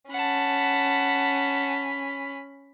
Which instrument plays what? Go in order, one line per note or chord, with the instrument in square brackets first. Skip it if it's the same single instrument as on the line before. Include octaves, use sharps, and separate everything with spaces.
[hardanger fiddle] C#4 B5 [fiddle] F#5 A5